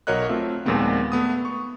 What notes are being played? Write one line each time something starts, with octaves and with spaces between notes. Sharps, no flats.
B1 F#4 A#4 C#5 D#5 F#6
A3 C4 F4 E5
D#2 A#2 F3 G#3 B3 C4
A3 B3 D#6
C#6